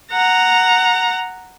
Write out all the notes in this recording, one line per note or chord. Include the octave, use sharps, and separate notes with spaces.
F#5 A#5